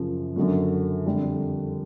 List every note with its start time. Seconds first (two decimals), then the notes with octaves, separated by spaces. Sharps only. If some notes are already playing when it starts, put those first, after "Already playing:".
Already playing: F#2 C#3 F3
0.36 F#2 D3 F#3
1.06 F2 D3 G3